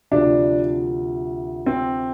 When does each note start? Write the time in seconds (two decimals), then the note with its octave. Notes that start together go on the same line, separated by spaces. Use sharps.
0.11 D2 C3 F3 D4
1.66 C4